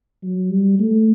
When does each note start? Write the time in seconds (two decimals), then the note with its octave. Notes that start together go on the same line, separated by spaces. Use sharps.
0.23 F#3
0.50 G3
0.79 A3